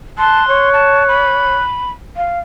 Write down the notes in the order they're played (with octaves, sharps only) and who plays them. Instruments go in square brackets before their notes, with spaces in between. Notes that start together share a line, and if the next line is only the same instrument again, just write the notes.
[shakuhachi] A5 [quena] C6 [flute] F#6
[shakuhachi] C#5
[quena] A5
B5
[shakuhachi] F5